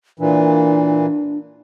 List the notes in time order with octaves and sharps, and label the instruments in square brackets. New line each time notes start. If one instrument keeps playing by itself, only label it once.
[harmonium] A#2 E3 [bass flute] D4